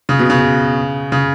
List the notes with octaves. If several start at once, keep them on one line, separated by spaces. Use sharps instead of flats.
C#3
B2
C#3
C#3